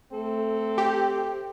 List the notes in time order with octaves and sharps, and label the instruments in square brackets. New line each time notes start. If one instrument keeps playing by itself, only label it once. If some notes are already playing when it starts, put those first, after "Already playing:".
[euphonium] A3 [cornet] C4 [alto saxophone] A4
[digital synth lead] G4